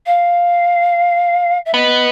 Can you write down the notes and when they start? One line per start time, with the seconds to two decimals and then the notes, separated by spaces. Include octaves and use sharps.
0.06 F5
1.65 E5
1.74 B3 D#5